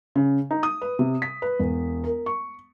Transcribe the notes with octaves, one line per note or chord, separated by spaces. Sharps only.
C#3
D#4
D#6
B4
C3
B6
B4
E1
A#4
C#6